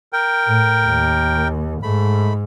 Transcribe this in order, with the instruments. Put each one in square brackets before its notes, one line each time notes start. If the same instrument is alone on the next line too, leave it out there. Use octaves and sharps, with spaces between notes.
[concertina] A#4 G5
[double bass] A2
D#2
[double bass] G#2 [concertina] A3 B5